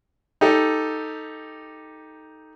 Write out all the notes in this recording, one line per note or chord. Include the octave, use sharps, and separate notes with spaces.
D#4 G4 A4